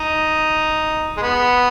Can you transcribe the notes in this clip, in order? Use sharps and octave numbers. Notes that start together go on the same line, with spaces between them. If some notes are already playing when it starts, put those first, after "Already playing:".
Already playing: D#4
G#3
B3